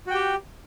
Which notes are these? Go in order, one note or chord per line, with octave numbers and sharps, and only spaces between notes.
F#4 G4 G5